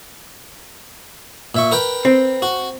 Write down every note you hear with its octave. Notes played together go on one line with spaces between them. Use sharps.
A#2 E5 C#6
A#4 B4 G5
C4
F#4